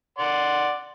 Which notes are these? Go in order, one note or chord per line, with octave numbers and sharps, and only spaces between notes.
D5 F#5 C6